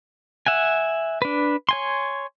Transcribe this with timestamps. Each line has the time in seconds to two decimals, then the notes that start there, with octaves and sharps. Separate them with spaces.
0.47 E5 F#5 G#5
1.22 D4 B4
1.69 C#5 G#5 C6